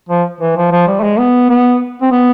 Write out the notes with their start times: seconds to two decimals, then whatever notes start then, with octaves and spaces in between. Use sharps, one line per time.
0.09 F3
0.41 E3
0.56 F3
0.72 F3
0.88 G3
1.00 A3
1.04 G#3
1.19 B3
1.50 B3
2.02 C4
2.12 B3